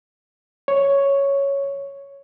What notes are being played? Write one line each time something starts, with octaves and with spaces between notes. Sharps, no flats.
C#5